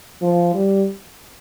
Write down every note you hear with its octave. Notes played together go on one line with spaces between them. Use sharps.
F3
G3